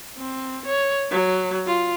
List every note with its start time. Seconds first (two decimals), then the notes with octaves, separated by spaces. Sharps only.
0.18 C4
0.65 C#5
1.11 F#3
1.67 F4